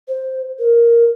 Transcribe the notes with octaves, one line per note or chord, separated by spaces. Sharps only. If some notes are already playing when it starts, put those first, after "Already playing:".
C5
A#4